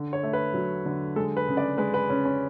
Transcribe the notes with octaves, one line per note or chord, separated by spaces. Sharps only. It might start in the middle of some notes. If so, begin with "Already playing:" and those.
Already playing: D3
C#5
A3
B4
F#3
D3
G#3 A4
B4
C#3
D5
G#3 B4
B4
C#3 C#4
C#4